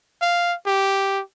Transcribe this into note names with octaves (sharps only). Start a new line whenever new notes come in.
F5
G4